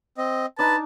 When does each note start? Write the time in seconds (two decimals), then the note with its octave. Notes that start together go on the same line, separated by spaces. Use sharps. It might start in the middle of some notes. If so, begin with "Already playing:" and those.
0.18 C4 D#5
0.59 D4 D#4 B4 A5